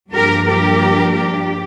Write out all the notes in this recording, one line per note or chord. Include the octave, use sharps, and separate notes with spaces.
G2 F3 A#3 D4 G4 A#4
G4 A#4
G4